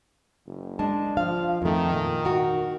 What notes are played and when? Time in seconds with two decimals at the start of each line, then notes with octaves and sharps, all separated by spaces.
0.46 F#1
0.79 G#3 D4 A5
1.17 F3 F5
1.62 F2 D#3 A3
1.92 A#2
2.25 F#4 A#4